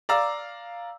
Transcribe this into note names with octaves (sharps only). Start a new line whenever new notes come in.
D5 F5 A#5 D6 E6